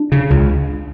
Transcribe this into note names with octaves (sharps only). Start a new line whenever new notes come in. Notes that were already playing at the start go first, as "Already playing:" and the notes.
Already playing: D4
C#3
C#2